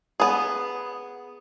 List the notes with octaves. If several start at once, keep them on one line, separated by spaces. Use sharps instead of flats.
B3 G#4